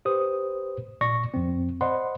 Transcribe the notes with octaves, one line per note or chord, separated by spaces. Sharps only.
G4 B4 C5 D#6
G#1 A#2 D5 C#6 A#6
F2 C4
C5 D5 D#5 F#5 B5 C6